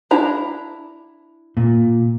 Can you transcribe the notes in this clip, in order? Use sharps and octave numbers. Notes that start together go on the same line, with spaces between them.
D4 E4 A#5
A#2